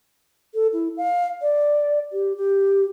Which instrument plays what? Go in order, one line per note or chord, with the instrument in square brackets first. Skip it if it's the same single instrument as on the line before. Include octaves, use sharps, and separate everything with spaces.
[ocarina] A4
E4
F5
D5
G4
G4